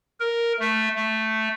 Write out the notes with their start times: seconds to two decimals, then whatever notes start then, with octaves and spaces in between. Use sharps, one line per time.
0.20 A#4
0.59 A3
0.95 A3